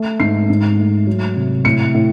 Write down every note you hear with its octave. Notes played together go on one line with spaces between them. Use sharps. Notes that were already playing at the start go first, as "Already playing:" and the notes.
Already playing: A3
G#2 C7
G#2
A3
F#3
C3
A2 C#7
A2